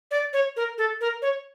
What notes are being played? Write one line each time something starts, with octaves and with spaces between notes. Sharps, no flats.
D5
C#5
A#4
A4
A#4
C#5